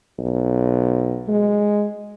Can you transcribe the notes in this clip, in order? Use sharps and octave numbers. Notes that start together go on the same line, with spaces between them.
B1
G#3